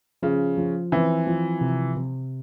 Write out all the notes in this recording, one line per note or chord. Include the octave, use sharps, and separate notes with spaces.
C#3 F3
F3
E3 C4
F3
C3
C3